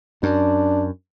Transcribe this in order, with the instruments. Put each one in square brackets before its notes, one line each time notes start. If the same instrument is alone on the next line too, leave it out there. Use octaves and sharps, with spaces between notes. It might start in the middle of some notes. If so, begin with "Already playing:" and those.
[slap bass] F#2 [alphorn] D4